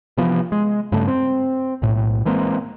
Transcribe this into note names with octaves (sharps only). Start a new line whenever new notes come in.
C3 E3 F3 B3
G#3
G2 C#3 G3 A3
C4
B1 A2
E3 G#3 A#3 C4